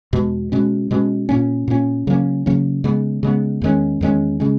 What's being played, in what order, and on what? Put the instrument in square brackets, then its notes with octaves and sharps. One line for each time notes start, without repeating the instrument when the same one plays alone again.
[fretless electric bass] E2 B2 G#3
B2 G#3 C#4
B2 G#3 C#4
A#2 A#3 C#4
A#2 A#3 C#4
C#3 F#3 A#3 C#4
C#3 F#3 A#3 C#4
C#3 G#3 B3
C#3 G#3 B3
E2 D#3 G#3 C#4
E2 D#3 G#3 C#4
C#3 G#3 C#4